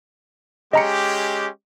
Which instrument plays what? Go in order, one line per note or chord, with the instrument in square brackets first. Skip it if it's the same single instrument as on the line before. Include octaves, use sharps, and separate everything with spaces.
[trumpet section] G#3 C#4 G4 [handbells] D#5 A#5 C#7